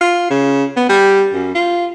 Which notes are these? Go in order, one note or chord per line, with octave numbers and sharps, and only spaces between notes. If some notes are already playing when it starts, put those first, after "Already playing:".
F4
C#3
B3
G3
F#2
F4